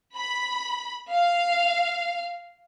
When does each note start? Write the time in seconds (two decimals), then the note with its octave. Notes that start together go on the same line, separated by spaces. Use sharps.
0.16 B5
1.11 F5